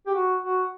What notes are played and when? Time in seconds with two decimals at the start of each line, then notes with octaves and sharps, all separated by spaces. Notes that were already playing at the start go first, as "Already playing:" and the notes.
0.07 G4
0.15 F#4
0.43 F#4